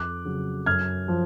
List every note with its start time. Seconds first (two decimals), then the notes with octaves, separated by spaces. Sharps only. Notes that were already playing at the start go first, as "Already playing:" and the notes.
Already playing: F2 D6 F#6
0.25 C#3 F#3
0.66 F#2 F6 G#6
1.08 F3